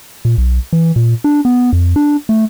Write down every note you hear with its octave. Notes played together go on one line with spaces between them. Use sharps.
A#2
B1
E3
A#2
D4
B3
F2
D4
A3